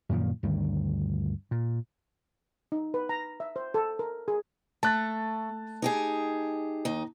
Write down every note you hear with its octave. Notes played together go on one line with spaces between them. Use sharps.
F#2 A#2 D#3 F3
D2 G2 D#3
A#2
D#4
B4
A#5
E5
C5
A4
A#4
G#4
A3 A5 F#6 A6
D#4 G4 G#4
D#2 D#4